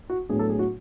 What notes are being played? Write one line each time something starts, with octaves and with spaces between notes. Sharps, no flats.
F#4
A2 F#3 B3 D4 G#4
A4
G#4
F#4